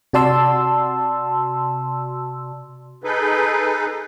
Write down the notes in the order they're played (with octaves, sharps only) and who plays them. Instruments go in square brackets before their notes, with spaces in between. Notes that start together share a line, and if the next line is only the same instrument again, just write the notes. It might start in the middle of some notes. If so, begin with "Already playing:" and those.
[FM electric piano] C3 F#4 D5 A5 C6 E6
[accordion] D#4 G#4 A4 B4